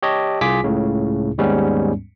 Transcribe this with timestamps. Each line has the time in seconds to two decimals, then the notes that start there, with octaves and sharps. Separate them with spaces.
0.03 G4 C#5 D#5 A5
0.41 C2 F4 G#4 G#5 D6 B6
0.64 C#2 A2 C#3
1.38 D#2 G#2 G3 G#3 B3 C#4